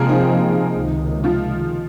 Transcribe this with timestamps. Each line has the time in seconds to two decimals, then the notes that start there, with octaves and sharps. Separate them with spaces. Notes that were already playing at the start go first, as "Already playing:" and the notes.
Already playing: C3 F3 G#3 A#3 C4 G#4 A#4
0.09 D#4
0.75 C#2 C3 D#3
1.24 F3 F4